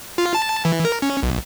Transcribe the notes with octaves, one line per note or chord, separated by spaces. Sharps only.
F4
A5
E3
A#4
C#4
B1